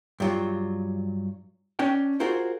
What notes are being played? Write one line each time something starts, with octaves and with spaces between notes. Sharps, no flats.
G2 F#3 F4
C#4 D4 G5
F4 F#4 G#4 A#4 C5